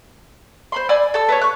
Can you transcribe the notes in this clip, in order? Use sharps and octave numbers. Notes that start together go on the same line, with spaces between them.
C5 B5 C6
D5 G#5 B5 E6
A4 A5 E6
B3 A4 C#5
C#6 F#6